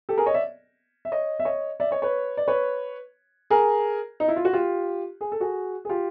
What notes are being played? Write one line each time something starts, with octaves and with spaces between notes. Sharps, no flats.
G4 A4
G#4 A#4
C#5 D#5
D5 E5
E5
C#5 D#5
E5
C#5 D#5
D5 E5
C#5 D#5
B4 C#5
D5
B4 C#5
G#4 A#4
D#4
E4
F4
F#4
F4 G4
G#4
A4
F#4 G#4
G#4
F4 G4